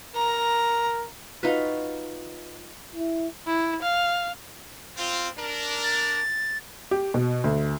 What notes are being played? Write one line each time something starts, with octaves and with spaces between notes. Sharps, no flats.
A#4 A#5
D#4 F4 F#4 B4
E4
E4
F5
C4 F4
D4 A#4
A6
G4
B2
D2